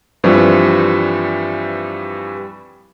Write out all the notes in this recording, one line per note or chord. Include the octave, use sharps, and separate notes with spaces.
G2 E3 F3 G3 C4 D4